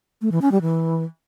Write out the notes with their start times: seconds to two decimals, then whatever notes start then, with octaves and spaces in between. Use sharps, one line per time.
0.22 A3
0.32 E3
0.42 C#4
0.52 G3
0.62 E3